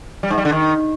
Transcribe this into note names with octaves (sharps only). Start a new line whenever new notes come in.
G3
G#2
G3
D3
D#3